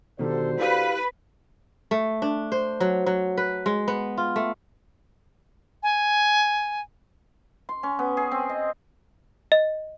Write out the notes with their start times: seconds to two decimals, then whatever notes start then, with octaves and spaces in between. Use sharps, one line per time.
0.19 B2 D3 D#3 G3 F#4 A4 C5
0.59 E4 G4 B4 D5 F5
1.91 A3
2.22 D4
2.52 C5
2.80 F#3
3.06 F#3
3.37 B4
3.66 G#3
3.88 B3
4.18 F4
4.36 A3
5.83 G#5
7.69 C6
7.83 C#4
7.99 B3
8.17 G#4
8.32 C4
8.49 D#5
9.52 D#5